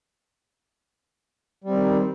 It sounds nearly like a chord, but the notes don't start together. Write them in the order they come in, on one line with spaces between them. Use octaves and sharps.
G3 C4 D#3